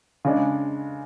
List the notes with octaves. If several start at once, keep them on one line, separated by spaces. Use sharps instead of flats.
C#3 G#3 D4